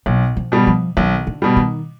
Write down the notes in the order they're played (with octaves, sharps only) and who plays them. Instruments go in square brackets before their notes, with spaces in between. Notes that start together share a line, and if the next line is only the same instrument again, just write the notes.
[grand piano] B1 [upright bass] B2
[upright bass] F3
[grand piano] B2 G3
[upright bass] F3
[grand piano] B1 [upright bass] D#3
[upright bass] D3
[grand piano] B2 G3
[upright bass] D#3